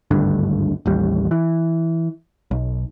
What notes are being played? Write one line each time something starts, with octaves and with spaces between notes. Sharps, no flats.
G#1 D2 G2 D3
A1 D#2 G3
E3
B1